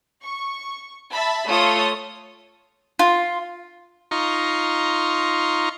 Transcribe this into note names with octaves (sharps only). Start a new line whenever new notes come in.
C#6
E5 A5 B5
A3 F4 A4 C#5 D#6
F4
D#4 F4 A#5 C6 C#6